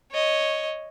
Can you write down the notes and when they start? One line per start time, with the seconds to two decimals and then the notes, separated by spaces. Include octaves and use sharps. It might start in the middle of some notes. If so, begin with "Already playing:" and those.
0.12 C#5 D#5